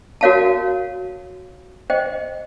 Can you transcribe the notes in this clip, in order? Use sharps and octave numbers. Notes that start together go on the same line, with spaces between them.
F#4 A#4 C#5 F5 A5
C5 D#5 G5